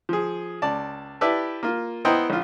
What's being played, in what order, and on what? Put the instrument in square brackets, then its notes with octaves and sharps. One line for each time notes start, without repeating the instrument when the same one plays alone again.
[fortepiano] F3 G#4
C#2 D5 A5
E4 G4 B4 D5 E5 A5
A#3 F4
B3 E4 C5 D#5 G5 A#5
A#1 F4